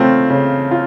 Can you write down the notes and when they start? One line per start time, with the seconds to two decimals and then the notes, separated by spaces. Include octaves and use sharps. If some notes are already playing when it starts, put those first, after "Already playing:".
Already playing: C#3 A3 C4 F4
0.30 C#3
0.71 F4